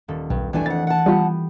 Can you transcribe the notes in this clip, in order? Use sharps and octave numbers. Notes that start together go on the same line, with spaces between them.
D#1 A4
B1 G2
G2 E3 A3 D4 G#5
F2 F#5 A6
F#5 A5
G3 B3 F4 G4